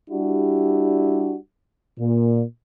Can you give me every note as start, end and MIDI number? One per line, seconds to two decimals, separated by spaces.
0.10 1.37 55
0.10 1.37 62
0.10 1.37 64
0.10 1.37 66
0.10 1.37 67
1.99 2.42 46